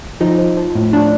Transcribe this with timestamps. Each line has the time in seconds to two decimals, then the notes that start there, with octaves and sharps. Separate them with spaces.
0.20 F3 D#4
0.39 F3
0.57 F3
0.75 A2
0.93 A2 D4